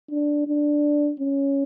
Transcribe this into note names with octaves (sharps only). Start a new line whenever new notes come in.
D4
D4
C#4